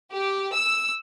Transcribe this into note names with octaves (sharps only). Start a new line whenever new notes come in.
G4
E6